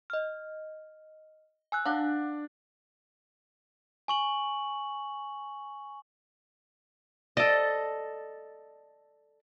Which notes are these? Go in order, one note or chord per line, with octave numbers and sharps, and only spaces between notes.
D#5 F6
G#5 E6 F#6
D4 F5 F#5
G#5 C#6 F#7
A4 D5 D#5